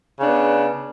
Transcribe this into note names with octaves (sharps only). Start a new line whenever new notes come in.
C#3 B3 D4